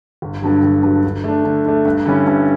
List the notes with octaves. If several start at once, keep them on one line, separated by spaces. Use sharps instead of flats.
G1
G2 D3 F#3
G1
G2 D3 F#3
D3
A3 D4
D3
A3 D4
G2
D3 G3 C#4 E4
G2